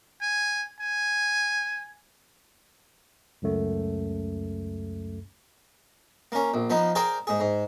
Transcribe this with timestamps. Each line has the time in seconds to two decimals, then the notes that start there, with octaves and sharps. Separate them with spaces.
0.21 G#5
0.80 G#5
3.42 C#2 F#2 A3
6.32 A#3 C#4
6.54 A#1
6.70 F3 B3 D#4
6.95 G#4 A#4 C5 D5 G5
7.27 G#2 G#4
7.40 G#2